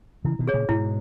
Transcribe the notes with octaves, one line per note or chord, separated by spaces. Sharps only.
C#3 E3 E4
B2 D#3
G#4 C#5
A#2 C#3
G#2 B2 E4